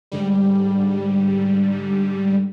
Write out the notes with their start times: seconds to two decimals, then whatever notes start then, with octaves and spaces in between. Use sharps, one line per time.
0.12 G#2 D3 G3